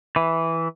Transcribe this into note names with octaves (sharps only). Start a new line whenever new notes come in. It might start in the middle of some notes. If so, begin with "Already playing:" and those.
E3